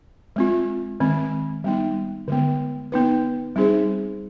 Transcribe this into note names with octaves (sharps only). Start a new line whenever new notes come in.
G#3 C4 F4
D#3 G#3 C4
G3 B3 D#4
D3 G#3 B3
B3 D#4 B4
G3 C4 D#4 G#4 C5